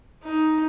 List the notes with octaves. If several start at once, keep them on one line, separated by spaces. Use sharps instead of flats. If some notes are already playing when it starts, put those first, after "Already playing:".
D#4